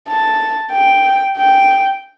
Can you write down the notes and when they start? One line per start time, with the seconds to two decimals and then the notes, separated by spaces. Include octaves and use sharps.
0.08 A5
0.73 G5
1.38 G5